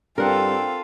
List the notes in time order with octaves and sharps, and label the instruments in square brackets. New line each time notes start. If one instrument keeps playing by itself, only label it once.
[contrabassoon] G2 [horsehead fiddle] C4 [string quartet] F4 A4 [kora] A#4 F#5